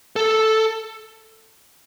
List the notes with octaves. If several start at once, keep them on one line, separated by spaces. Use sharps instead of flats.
A4